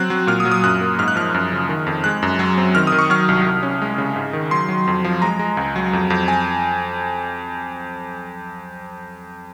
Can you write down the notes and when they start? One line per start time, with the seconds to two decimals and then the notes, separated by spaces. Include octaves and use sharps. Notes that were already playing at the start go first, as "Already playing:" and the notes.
Already playing: F#3 C4 F#6
0.10 F#3
0.27 A#2 F6
0.40 D#6
0.45 F#3
0.52 D#6
0.63 F#2 F#6
0.81 A#3
0.98 G#2 F6
1.08 F#6
1.16 F3 F6
1.34 F#2
1.52 C#3
1.69 D#3
1.87 F2
2.04 G#3 F#6
2.23 F#2
2.39 F#3
2.58 C4
2.75 D#3 F6
2.87 D#6
2.92 D#3
2.99 C#6
3.10 F#3 F6
3.29 C2
3.46 C2
3.63 C#4
3.82 G#3
3.98 C#3
4.16 G#2
4.33 D#3
4.51 F#3 C6
4.69 F#3
4.87 F2
5.04 F3
5.22 G#3 A#5
5.39 G#3
5.57 C#2
5.76 F#3
5.93 F2
6.10 F2
6.28 G#5